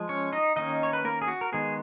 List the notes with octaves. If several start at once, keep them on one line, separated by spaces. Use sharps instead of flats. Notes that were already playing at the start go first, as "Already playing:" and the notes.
Already playing: F3 G#3
C#4 C#5
D#4 D#5
D#3 A#3 C#4 D#4 D#5
C#5
B4
A#3 A#4
G#4
F#4
A#4
D#3 G#3 B3 G#4